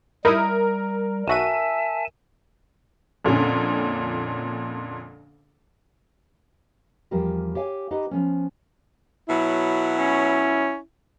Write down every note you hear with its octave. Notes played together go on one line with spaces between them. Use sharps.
G3 D#4 E4 A#4 D#6
B1 F#4 E5 G#5 A5 D#7
F2 A#2 D3 C#4
E2 F3 G3 G4 A#4 B4
G4 C#5 F5 G#5
D#4 G4 B4 D#5 F#5
F3 B3 C#4
B2 F#3 E4
C#4